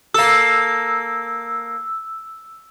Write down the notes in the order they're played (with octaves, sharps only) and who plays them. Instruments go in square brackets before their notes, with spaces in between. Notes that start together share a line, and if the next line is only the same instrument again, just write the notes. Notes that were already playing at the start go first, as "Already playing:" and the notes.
[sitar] A#3 A4 [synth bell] E6